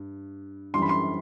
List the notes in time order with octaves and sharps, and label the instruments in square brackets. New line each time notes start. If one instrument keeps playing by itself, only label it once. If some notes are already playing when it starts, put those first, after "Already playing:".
Already playing: [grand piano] G2
F#2 E3 G3 D4 C6
B5
C6